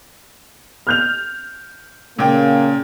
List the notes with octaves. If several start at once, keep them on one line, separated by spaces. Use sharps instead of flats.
F6 G6 F7
A#2 C#3 A#3 G5